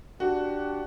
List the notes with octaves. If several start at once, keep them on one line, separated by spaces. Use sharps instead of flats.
D4 F#4 G4